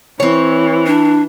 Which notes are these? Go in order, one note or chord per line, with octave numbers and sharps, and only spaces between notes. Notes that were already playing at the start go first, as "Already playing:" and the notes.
E3 C4 C#5
D4